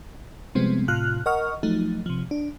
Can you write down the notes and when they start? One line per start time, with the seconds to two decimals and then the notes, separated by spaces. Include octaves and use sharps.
0.55 C3 F3 G3 G#3 B3 C4
0.88 A2 C3 F4 F6 F#6
1.26 A#4 D#5 F#5 C#6 F6
1.63 F3 F#3 A3 D#4
2.06 C3 F3
2.31 D4